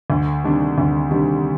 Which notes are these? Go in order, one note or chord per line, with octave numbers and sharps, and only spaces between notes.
D2
C3 D#3 G3 D4
D2
C3 D#3 G3 D4